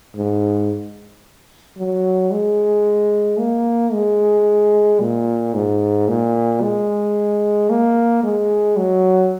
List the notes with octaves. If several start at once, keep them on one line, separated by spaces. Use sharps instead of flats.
G#2
F#3
G#3
A#3
G#3
A#2
G#2
A#2
G#3
A#3
G#3
F#3